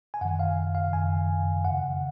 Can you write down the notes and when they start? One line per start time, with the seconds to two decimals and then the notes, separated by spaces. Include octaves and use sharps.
0.14 G#5
0.21 F#2 F#5
0.25 D#3
0.39 F5
0.75 F5
0.93 F#2 D#3 G#5
1.65 F2 C#3 F#5